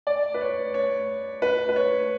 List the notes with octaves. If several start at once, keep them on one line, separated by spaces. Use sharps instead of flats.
D5
B4
C#5
C#5
B4
B4
C#5